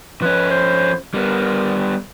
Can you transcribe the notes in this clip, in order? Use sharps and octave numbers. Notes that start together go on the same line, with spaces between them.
F3 C#4 B4
C5
G3 B3 A#4